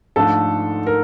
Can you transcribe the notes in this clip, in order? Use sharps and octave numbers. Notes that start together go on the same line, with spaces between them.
G#2 F3 A3 D4 A4
A#4